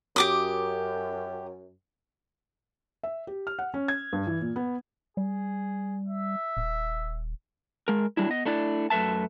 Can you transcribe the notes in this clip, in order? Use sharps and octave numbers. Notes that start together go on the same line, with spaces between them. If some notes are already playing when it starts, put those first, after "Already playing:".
F#2 G4 D6 D#6
E5
G4
F6
F#5
C#4
G#6
G2
E3
A#2
B3
G3 G#4
E5
D#1
G#3 A#4
F#3 G3 D4 E4
B3 D#5
A3 D4 E4 D5
F#2 A3 B4 E5 A5